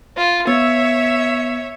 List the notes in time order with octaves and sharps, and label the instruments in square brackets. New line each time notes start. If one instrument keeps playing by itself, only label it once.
[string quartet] F4
[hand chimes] B3 [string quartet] C#5 E5